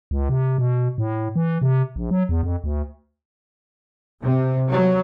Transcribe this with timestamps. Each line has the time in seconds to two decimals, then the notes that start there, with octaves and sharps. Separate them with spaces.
0.11 C#2
0.29 C3
0.58 B2
0.98 A2
1.36 E3
1.62 C3
1.96 A#1
2.11 F#3
2.29 E2
2.43 F2
2.64 D2
4.23 C3
4.68 F#3